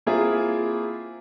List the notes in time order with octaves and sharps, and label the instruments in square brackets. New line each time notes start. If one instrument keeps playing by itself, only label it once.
[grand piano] A#3 C4 E4 F4 G#4